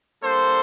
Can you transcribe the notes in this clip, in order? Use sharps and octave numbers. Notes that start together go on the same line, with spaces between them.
G3 A#3 D4 A4 C5